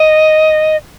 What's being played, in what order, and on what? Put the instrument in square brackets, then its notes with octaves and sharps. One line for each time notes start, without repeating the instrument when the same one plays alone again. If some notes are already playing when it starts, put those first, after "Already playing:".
Already playing: [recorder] D#5